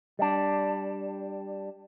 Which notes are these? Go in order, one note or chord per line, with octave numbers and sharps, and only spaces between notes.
G3 D4